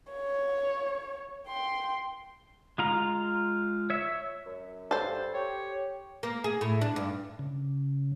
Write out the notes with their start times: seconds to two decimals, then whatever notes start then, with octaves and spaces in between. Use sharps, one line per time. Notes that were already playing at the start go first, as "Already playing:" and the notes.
0.12 C#5
1.48 G5 C6
2.78 G#3 F4 A#5
3.90 C#5 E5
4.46 F#2
4.91 G2 A4 C5
5.34 G4 C#5
6.23 A#3
6.44 G#4
6.61 A2
6.81 D4
6.96 G2
7.39 C#3